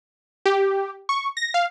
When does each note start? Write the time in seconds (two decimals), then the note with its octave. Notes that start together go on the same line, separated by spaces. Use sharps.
0.46 G4
1.09 C#6
1.37 A#6
1.54 F5